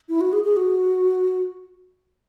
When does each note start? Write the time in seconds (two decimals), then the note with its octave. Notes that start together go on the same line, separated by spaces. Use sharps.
0.09 E4
0.21 F#4
0.33 G#4
0.44 G#4
0.56 F#4